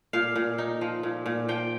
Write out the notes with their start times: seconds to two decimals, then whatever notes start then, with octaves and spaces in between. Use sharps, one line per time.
0.13 A#2 F5
0.36 A#2
0.58 D#4
0.81 F3
1.03 A#2
1.26 A#2
1.49 F3 G5